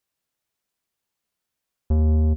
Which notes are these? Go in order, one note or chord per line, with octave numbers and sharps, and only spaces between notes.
D#2